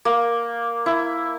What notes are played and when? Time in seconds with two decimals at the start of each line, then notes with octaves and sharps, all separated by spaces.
0.05 A#3
0.86 E4